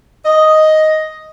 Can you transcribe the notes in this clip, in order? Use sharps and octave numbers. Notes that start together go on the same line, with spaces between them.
D#5